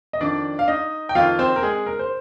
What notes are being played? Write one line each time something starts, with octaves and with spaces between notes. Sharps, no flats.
D#5
F2 D#3 D4 D5
F5
D#4 D#5
G5
F2 D#3 F4 F5
C4 C5
A#4
G#3 G#4
A#4
C5